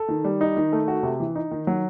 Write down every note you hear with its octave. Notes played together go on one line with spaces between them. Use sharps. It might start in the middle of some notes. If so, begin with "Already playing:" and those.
Already playing: A4
D#3
G3
D#4
D#3
A3
F#4
C3
E3
D#4
D#3
F#3